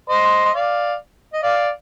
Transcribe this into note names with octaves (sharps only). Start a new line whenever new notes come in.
C5 D#5
D#5
D5 F5
D#5
D5 F5